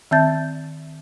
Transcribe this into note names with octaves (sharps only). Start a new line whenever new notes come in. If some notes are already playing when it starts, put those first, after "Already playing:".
D#3 C4 E5 A5 G6 A6